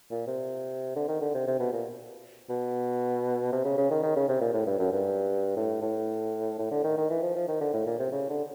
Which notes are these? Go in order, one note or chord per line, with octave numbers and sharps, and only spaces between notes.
A#2
C3
D3
D#3
D3
C3
C3
B2
A#2
B2
C3
C#3
C#3
D#3
D#3
C#3
C3
A#2
A2
G2
F#2
G2
A2
A2
A2
D3
D#3
D#3
E3
F3
F3
D#3
D3
A2
A#2
C3
C#3
D3